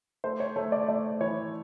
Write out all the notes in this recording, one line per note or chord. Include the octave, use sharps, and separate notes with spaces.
A3 C5
C#5
A3 C#5
D5
A3 D5
E3 C#5